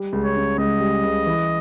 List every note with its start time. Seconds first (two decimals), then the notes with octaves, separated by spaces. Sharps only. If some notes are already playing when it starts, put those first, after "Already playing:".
Already playing: G3
0.13 C#2
0.24 C#5
0.36 C#3
0.58 C#2 D#5
0.80 G3
1.04 C#2
1.26 E3